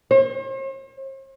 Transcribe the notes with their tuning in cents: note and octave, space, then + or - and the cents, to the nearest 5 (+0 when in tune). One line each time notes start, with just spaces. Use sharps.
C5 +45